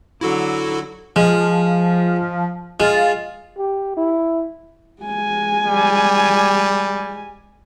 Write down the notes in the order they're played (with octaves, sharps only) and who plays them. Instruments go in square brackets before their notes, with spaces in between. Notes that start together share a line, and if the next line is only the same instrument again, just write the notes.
[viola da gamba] D3 F#3 [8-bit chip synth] E4 F#4 A4
[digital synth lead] F3 [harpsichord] G#3
[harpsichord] G#3 [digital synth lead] F4
[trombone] G4
E4
[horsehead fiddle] G#3 G#5
[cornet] G3